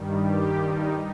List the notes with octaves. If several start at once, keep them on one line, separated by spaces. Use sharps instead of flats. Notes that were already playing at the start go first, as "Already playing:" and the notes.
Already playing: G2 D#3 G3
G4
D#4